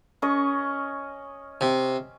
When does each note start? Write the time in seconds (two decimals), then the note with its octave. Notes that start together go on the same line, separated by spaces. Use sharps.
0.22 C#4 D#5 C#6
1.61 C3